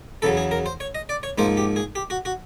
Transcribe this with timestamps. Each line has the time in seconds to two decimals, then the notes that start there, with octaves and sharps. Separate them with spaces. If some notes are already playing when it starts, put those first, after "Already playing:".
0.22 E2 C#3 F#3 A4
0.37 G#4
0.51 A#4
0.66 C5
0.80 C#5
0.95 D#5
1.09 D5
1.23 C#5
1.38 G#2 F3 A#3 C5
1.57 G4
1.76 G#4
1.95 G4
2.10 F#4
2.25 F#4